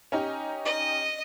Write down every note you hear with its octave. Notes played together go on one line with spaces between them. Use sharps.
C#4 D#4 G4
D#5